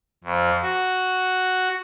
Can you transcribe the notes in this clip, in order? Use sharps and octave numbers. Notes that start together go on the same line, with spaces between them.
F2
F#4